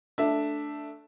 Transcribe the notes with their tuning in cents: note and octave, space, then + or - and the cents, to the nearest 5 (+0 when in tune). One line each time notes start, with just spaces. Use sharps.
A3 +0 D4 +0 E5 +0